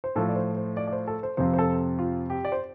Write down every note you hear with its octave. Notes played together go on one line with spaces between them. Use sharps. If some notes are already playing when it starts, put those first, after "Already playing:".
C5
A2 F3 A3 A4
D5
C5
C5
D5
D5
C5
A4
C5
F2 C3 F3 C4 C5
C5
A4
F4
G4
D5
C5